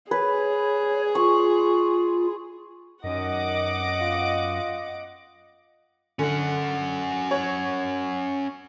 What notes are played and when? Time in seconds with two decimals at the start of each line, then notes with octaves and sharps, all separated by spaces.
0.11 G#4 B4 C#5
1.15 F4 C#6
3.04 F#2 D#3 D#5 F#5 D6
4.01 F4
6.19 D3 C#4 F#5
7.31 C#5